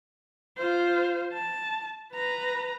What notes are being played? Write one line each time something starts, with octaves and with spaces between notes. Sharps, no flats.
F4 C5
A5
B4 A#5